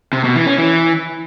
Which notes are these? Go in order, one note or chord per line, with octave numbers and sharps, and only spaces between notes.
C3
B2
E3
C#4
E3